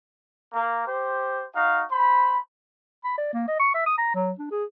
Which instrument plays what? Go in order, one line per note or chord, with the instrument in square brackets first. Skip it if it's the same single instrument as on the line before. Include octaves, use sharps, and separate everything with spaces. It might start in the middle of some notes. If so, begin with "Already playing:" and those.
[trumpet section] A#3
G4 C5
D#4 F#4 F5
C5 B5
[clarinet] B5
D5
A#3
D#5
C#6
E5
D#6
A#5
F#3
D4
G#4